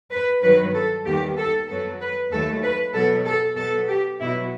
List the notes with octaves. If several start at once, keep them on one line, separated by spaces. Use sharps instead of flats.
B4
G2 D#3 F#3 B3 B4
A4
D#2 D#3 G3 B3 G4
A4
F#2 F#3 B3 A4
B4
D#2 D#3 F#3 A3 A4
B4
B2 F#3 B3 A4
A4
B2 F#3 B3 A4
G4
B2 F#3 B3 E4